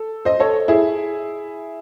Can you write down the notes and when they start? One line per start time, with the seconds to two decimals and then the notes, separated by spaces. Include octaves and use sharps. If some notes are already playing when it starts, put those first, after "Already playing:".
Already playing: A4
0.25 C5 D#5
0.40 A4 C#5
0.68 E4 G#4